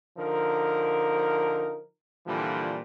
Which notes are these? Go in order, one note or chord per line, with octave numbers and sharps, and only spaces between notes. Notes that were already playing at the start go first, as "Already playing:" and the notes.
D3 F3 D#4 A#4
A#2 D3 E3 F3 G3